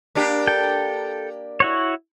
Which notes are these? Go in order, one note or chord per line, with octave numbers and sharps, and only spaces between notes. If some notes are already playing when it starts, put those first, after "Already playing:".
A#3 D4 G4
A4 G5
E4 F#4 C#5